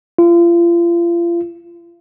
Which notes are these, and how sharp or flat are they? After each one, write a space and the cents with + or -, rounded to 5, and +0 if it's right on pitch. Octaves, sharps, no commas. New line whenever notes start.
F4 -35